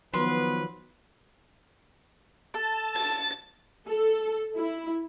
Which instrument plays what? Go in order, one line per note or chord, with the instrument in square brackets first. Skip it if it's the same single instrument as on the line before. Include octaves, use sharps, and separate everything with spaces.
[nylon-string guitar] D#3 F3 F#3 [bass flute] B3 [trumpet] B4 [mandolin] C6
[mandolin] A4 [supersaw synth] A5
[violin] A6
[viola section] A4
E4